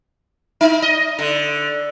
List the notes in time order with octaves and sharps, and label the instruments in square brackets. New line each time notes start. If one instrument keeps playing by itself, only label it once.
[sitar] D#4
D#5
D3